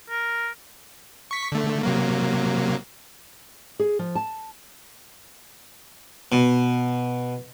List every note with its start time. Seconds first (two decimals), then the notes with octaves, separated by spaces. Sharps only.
0.10 A#4
1.31 C#6 B6
1.52 D3 A3
1.83 C3 F#3 A#3
3.79 G#4
3.99 F3
4.15 A5
6.32 B2